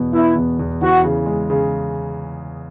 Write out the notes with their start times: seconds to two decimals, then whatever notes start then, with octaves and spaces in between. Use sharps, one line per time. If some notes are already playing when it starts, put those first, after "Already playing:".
Already playing: E2 B2 B3
0.13 B3 E4
0.36 E2
0.59 E2
0.81 E3 F#4
1.04 C#3
1.26 G#3
1.50 C#3